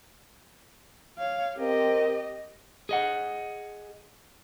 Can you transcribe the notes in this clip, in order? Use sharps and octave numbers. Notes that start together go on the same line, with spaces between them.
C#5 F5
C4 G4 A#4 D#5
G#4 D#5 F#5